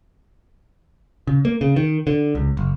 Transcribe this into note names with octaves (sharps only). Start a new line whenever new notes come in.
C#3
A#3
C#3
D#3
D3
C#2
F#1